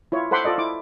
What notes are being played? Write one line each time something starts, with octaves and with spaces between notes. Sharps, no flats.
E4 F4 C#5
A4 C5 F#5 B5 C6 D6
F4 A4 D5 D#5
E4 D6